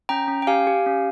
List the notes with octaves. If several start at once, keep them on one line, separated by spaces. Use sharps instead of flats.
C#4 G5 A#5
C#4
G5
G4 F5 G#5
G4
C#4